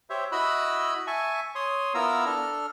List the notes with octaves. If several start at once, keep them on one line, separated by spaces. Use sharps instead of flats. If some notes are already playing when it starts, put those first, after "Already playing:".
G4 C5 C#5 E5
E4 F#4 D#5 B5 E6 F#6
E5 G#5 A5 C#6
C#5 C6 D#6
B3 E4 F4 A#4 A#5 E6
D4 A4 F6